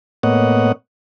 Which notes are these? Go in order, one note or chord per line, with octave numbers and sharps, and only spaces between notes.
A2 A#3 B3 C#5 D#5 F#5